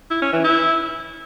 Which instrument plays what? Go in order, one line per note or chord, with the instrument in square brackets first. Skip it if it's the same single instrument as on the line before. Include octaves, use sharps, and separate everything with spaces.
[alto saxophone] E4
C#4
E3
E4